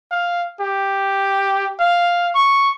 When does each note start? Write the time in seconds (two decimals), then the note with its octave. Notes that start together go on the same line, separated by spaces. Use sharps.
0.11 F5
0.61 G4
1.80 F5
2.35 C#6